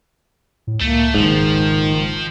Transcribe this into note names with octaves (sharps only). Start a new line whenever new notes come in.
A2
C#2 A3 A#3
F#1 G#2 D#3 F3